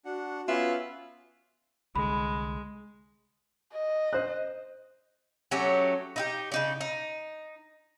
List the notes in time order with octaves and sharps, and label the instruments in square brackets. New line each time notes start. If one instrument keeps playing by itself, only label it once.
[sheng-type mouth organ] D4 F#5 [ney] F#4
[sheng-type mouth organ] B3 C#4 F#6 [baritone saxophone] F4 [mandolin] E5
[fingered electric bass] C2 D3 [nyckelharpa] G#3 [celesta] B5
[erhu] D#5
[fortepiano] C5 F#6
[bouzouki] F#3 A3 C#4 G4
D#4 E4 G4
C#3 D#4 D5
D#4